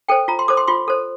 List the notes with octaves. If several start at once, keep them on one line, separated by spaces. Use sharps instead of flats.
A4 C5 G5
F4 A#5
C6
A4 C5 D6
C6
F4 C6
A4 C5